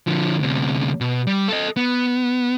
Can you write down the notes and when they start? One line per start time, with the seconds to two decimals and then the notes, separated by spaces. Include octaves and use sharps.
0.07 D3 F3
0.40 D2 C3
1.01 B2
1.27 G3
1.48 A4 D#5
1.77 B3